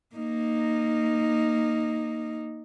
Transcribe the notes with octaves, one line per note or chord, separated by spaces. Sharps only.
A#3 D#4